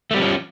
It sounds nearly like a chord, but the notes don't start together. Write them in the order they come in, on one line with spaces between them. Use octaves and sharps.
A3 G3 C4 F3 C#4